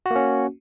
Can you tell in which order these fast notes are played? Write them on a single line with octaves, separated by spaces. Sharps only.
F#4 A#3 C#4